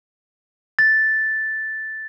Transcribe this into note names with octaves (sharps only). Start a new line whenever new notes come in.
A6